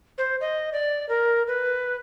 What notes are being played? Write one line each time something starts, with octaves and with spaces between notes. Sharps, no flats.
C5
D#5
D5
A#4
B4